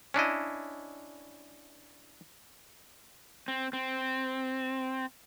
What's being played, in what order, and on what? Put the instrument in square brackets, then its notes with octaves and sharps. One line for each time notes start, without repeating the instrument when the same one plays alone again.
[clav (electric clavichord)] C#4 D4 E4 D#5
[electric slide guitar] C4
C4